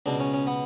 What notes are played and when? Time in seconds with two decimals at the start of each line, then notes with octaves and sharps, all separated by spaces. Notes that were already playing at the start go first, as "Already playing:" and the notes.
0.06 C#2 B2 D4
0.20 C#4
0.34 C#4
0.47 B3